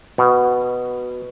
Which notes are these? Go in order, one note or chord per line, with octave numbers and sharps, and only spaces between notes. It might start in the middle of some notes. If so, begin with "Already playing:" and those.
B2